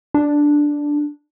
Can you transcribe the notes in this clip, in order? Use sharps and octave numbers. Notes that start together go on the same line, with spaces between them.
D4